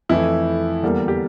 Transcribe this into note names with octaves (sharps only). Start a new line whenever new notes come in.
F2 E3 A3 E4
E2 D3 G3 A#3
G4